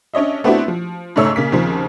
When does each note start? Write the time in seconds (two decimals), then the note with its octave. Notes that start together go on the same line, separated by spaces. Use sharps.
0.14 C#4 D4 C#5 D#5 E5
0.44 A3 B3 C4 D4 E4 F#4
0.68 F3
1.16 G#2 C#3 A3 C#5 E6
1.36 C#3 A#3 B6
1.52 D#2 C#3 F3 C4